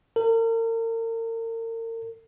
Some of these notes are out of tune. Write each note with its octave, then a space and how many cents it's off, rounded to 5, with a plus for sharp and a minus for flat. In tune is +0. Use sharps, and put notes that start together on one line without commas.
A#4 -40